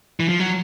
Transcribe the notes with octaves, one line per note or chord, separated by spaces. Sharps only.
E3
F3
F#3